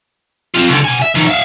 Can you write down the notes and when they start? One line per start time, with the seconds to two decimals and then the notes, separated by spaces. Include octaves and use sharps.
0.54 C4 F4
0.68 C#2 D3
0.84 B2 G#5
1.02 E5
1.15 E3 D#4
1.27 E5 F5